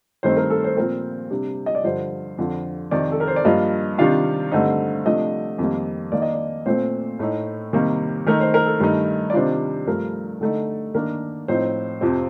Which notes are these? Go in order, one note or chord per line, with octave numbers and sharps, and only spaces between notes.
G2 D#3 A3 C4 D#4 C5
A#4
A4
C5
A#2 F3 C4 A#4
C3 G3 D4
D#5
D5
G2 D3 F3 C5
F2 D3 F3
F2 C3 D#3 D5
A4
A#4
C5
D5
G2 F3 A#3 F4 D#5
C3 D#3 G3 D4 F4 F5
G2 D3 A3 C4 D#4
C3 F3 A3 D4 D#5
F2 D#3 G3 A#3
D#3 A#3 D#4 D5
D#5
D5
A#2 A3 C4 C5
A2 A3 D#4
C3 D#3 G3 A#3
D#3 A3 D#4 A#4
C5
A#4
A4
G2 D#3 A3 D#4 A#4
D5
C3 D#3 G3 D4 F4 C5
G2 F3 A3 A#4
D3 A3 D#4 A4
D#3 A#3 D4 A#4
A2 F3 C4 D#4 C5
F2 C3 F3 C4